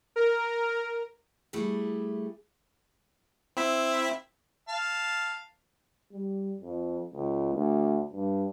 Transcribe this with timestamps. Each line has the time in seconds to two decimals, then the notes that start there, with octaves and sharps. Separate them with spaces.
0.16 A#4
1.53 G3 A3 E4 G#4
3.57 C4 E4 E5
4.69 F5 A5
6.12 G3
6.61 F2
7.13 C#2
7.55 D2
8.13 G2